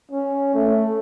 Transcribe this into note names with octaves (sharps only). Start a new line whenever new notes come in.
C#4
A3